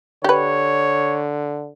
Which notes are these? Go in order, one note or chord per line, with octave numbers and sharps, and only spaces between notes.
D3 G4 B4 C#5